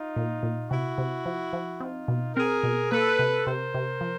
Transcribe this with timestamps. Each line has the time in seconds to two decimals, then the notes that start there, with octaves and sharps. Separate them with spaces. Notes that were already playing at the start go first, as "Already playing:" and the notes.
Already playing: D#4 F4
0.16 A#2
0.43 A#2
0.70 C3 E4 F#4
0.98 C3
1.26 F3
1.53 F3
1.80 C4 D#4 F4
2.08 B2
2.36 C4 G#4 A#4
2.63 B2
2.91 A#3 A4 B4
3.19 C3
3.46 C3 A#4 C5
3.74 C3
4.01 F3